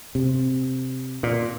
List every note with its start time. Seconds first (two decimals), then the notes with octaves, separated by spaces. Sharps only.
0.15 C3
1.23 A#2